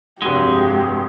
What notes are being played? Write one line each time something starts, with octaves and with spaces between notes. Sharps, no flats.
F1 G2 G#3 F#4 G4